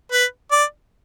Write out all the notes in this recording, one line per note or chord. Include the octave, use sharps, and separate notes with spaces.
B4
D5